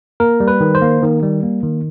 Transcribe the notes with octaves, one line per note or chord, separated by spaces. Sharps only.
A#3 A#4
G3
B4
D#3
C5
A#3
D#3
G3
A#3
D#3